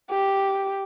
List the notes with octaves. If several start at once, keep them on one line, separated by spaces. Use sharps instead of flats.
G4